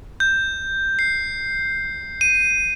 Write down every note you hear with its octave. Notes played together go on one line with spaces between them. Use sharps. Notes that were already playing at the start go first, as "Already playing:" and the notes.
G6
C7
D#7